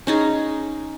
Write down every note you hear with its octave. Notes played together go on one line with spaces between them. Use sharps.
C#4 D#4 G#4